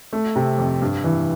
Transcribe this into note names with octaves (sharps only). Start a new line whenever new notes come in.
A3
C3
F2
G2
E3